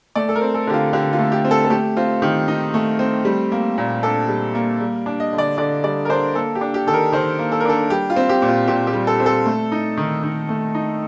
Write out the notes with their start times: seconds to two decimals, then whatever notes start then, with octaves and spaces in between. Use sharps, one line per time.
0.16 A3 D5
0.29 A4
0.35 A#4
0.42 C4
0.54 A4
0.67 D3 G4
0.73 F4
0.93 D3 G4
1.13 F4
1.19 A3
1.32 G4
1.45 C4
1.51 A4
1.65 A4
1.70 A3 G4
1.97 C4 F4
2.22 D#3 G4
2.48 D#4
2.74 A3
2.99 C4
3.25 G3
3.52 A#3
3.78 A#2
4.03 D4 A4
4.29 G3
4.55 A#3
4.81 G3
5.06 D4
5.20 D#5
5.33 D3
5.38 D5
5.58 D3 D5
5.84 G3 D5
6.05 A#4
6.10 D4 C5
6.35 A#3 A4
6.55 G4
6.61 D4
6.74 G4
6.87 D#3 A4
6.94 A#4
7.12 D#3 C5
7.39 A#3
7.52 A4
7.60 A#4
7.65 D4 A4
7.90 G3 G4
8.10 F4
8.16 C4
8.29 G4
8.42 A#2
8.48 F4
8.68 A#2 G4
8.87 G4
8.93 G3
9.07 A4
9.20 C4
9.26 A4
9.46 A3
9.72 D#4
9.97 D#3
10.23 D#3
10.49 A3
10.75 D#4